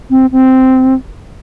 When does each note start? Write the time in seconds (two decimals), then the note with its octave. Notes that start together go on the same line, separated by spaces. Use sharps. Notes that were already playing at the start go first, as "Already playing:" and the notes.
0.11 C4
0.32 C4